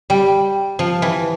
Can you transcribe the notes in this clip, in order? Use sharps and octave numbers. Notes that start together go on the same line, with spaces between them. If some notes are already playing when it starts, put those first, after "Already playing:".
G3
F3
E3